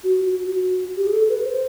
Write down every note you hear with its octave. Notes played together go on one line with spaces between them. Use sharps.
F#4
F#4
F#4
G4
G#4
A4
B4
C5